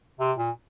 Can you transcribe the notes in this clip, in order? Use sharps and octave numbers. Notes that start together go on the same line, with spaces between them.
C3
A#2